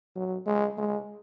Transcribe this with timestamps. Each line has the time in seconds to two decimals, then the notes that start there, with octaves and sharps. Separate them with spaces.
0.16 F#3
0.46 G#3
0.78 G#3